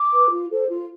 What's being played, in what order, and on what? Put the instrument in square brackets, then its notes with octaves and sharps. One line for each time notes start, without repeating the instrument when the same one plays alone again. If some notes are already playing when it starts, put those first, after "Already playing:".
Already playing: [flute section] D6
B4
F4
A4 C5
F4